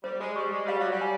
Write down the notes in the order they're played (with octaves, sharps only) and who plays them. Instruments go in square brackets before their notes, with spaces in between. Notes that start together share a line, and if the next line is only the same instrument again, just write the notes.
[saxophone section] G3 [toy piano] C5
[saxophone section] G#3
[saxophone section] G3 [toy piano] C#6
[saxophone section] G#3
[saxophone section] G3 [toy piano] F5
[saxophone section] F#3
G3
[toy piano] G#5